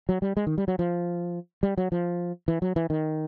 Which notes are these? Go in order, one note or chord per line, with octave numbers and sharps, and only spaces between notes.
F#3
G3
G#3
D#3
G3
F#3
F3
G3
F#3
F3
E3
F#3
E3
D#3